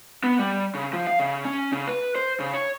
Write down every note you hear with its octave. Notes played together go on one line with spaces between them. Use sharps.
B3
G3
C#3
F3
F5
C#3
C#4
C#3
B4
C5
C#3
C#5